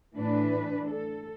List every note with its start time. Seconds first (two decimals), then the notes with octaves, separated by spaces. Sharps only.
0.17 A2 E3 D4 B4
0.91 A4